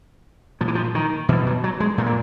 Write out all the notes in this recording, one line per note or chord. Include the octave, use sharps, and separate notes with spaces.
A#2 F3
E3
F3
D#3
B2 E3
F#3
F#3
G#3
A#2 A3
A#3